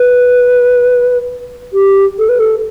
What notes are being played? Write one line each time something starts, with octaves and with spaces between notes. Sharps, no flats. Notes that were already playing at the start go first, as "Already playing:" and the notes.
Already playing: B4
G4
A4
B4
A4